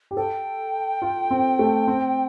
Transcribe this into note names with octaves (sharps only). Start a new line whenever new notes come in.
G4
A4 G5
F4
C4
A3
C4